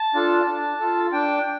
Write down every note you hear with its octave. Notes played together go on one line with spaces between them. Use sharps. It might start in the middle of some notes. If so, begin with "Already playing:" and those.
Already playing: A5
D4 F4 A4
D4
F4 A4
D4 G5